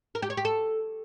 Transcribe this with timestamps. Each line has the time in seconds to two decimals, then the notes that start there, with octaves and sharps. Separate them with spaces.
0.15 A#4
0.22 G4
0.30 C#5
0.37 G4
0.45 A4